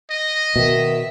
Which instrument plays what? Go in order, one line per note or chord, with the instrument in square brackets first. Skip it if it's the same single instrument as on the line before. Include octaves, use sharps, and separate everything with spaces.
[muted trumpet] D#5
[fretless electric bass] B2 [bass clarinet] D#3 [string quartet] E5